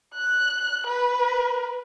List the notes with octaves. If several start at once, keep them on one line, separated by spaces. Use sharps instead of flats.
F#6
B4